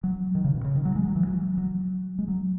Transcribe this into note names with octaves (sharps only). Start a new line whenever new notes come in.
F#3
D#3
C#3
B2
C#3
D#3
F#3
G#3
F#3
E3
F#3
F#3
G#3
F#3